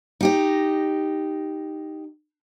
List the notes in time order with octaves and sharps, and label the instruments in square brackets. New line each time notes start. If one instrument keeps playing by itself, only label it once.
[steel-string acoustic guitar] D#4 G4 D#5